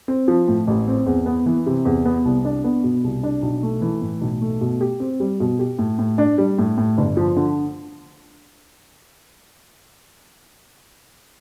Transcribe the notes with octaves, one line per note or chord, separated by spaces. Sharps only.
C4
F3
A2
A1
C4
E2
B3
E3
C3
E2
B3
C2
D4
B3
B2
C2
D4
B1
A3
E3
A2
B1
A3
B2
G4
C4
G3
B2
G4
A2
A2
D4
G3
A2
A2
G1
F3
D3